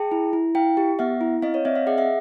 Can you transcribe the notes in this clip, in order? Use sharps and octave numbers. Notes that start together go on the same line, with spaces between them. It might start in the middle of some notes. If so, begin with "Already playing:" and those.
Already playing: G#4 G5 A5
E4
E4
E4 F5 G5
G4
B3 E5 F#5
E4
C4 D#5 F5
C#5 D#5
C4 D5 E5
D#5 F5
G#4 E5 F#5
E5 F#5